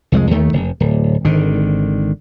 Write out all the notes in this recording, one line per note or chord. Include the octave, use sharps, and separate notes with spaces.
C2 F2 F3 G#3
D#2 D#3 A3
F1
D1
G#1 D3 D#3